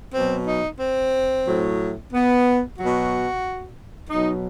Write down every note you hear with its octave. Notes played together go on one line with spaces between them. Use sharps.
B2 F#3 C4
D#4
C4
A2 F#3
B3
B2 F#3 F#4
B2 F#3 D#4